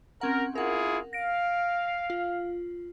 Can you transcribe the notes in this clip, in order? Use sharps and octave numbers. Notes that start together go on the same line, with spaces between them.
C4 C#4 A#4 F#5
E4 F4 G#4 A#4 F#5
F5 A#6 D7
F4